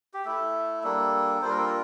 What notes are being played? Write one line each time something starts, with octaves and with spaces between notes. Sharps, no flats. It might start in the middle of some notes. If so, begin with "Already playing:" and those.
G4
A3 E4 A4
G3 A#3 D4 A4
G3 A#3 D4 F4 C5
A#4
A4
A#4